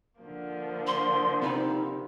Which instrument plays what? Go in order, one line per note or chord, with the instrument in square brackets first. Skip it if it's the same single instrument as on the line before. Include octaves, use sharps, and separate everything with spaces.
[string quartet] D3 F3 A#3
[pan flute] C6
[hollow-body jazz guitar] C3 B4 [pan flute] D#4